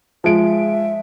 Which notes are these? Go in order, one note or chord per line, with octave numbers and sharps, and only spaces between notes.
F3 G#3 E5 D7